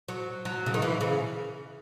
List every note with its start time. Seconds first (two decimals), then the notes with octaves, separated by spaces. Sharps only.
0.08 F#3
0.45 F#3
0.66 C#3
0.74 D#3
0.82 E3
1.01 C#3